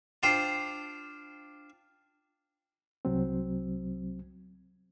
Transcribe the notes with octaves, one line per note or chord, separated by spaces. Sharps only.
D4 F4 C5 G5
C2 F#3 C4